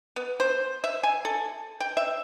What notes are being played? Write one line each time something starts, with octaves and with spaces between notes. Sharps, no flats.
B3
C5
E5
G#5
A4
G5
E5